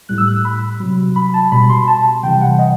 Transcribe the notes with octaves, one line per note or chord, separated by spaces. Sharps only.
A2 G3 F#6
E6
F#6
E6
B5
C3 F#3
B5
A5
B2 G3 B5
C6
A5
C3 E3 G3 G5
F#5
D#5